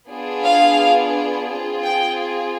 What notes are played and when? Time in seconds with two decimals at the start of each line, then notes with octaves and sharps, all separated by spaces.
0.09 B3 D4 F4 G#4
0.43 F5
1.48 C4 F4 G#4
1.83 G5